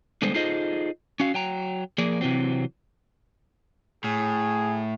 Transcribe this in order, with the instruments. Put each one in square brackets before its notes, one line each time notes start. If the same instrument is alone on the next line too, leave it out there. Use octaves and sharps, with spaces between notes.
[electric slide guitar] D3 G3 G#3 B3 A4 C5
D#4 F4 G#4 A4 C5 D#5
C#4 F#4 F5
F#3 G5 A#5
F3 A#3 G#4 A#4 D5
C3 E3 F#3 C4
[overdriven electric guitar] A2 [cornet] G#4